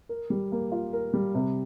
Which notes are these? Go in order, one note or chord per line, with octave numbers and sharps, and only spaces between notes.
A#4
G3
A#3
F4
A#4
G3
C3